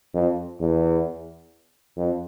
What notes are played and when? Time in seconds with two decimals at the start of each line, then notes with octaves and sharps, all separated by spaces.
0.14 F2
0.60 E2
1.96 F2